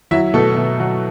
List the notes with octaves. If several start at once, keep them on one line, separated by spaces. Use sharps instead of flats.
F#3 E4 E5
B2 A3 A4
B2
F#3